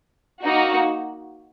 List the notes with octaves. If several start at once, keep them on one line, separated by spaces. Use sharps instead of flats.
A#3 D#4 F#4